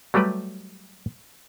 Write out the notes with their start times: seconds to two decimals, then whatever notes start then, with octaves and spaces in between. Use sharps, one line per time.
0.14 F#3 G3 A3 G4 B4